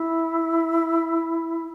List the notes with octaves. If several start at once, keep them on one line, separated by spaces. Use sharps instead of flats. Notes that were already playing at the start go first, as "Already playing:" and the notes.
Already playing: E4